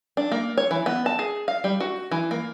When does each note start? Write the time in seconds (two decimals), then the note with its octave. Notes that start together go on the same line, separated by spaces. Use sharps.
0.17 D4
0.32 A#3
0.57 C#5
0.71 E3
0.86 B3
1.06 A5
1.19 G#4
1.48 F5
1.64 G3
1.80 F#4
2.11 E3
2.31 A#3